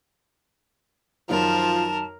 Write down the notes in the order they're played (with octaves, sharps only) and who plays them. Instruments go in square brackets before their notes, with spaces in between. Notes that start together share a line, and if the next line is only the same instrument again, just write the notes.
[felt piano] F#2 D#3 [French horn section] F3 F4 [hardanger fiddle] A#4 [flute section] A5